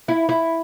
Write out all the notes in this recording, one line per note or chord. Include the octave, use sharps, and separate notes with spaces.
E4
E4